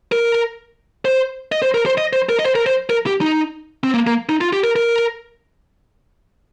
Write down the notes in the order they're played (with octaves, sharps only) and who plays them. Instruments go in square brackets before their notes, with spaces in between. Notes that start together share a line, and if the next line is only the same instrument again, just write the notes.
[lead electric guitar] A#4
C5
D#5
C5
A#4
C5
D#5
C5
A#4
D#5
C5
A#4
C5
A#4
G4
D#4
C4
A#3
A#3
D#4
F4
G4
A#4
A#4